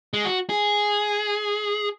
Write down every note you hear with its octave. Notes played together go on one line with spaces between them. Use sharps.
G#3
F#4
G#4